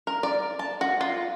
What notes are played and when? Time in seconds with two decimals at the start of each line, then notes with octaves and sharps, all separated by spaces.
0.07 A#4
0.23 D5
0.59 A5
0.81 F#4
1.01 F4